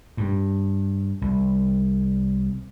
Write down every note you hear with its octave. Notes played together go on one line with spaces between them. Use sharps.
G2
C2